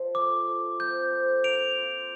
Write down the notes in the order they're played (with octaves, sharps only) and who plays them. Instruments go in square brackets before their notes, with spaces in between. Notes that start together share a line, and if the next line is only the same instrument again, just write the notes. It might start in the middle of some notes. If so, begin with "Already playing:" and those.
Already playing: [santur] F3
[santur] A3 [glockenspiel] D6
[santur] A3
[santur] C4 [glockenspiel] G6
[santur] C5
[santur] A#3 [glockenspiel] D7 F7
[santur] F4